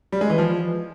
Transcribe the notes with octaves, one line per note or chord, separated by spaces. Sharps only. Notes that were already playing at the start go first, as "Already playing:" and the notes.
G3
G#3
E3
F3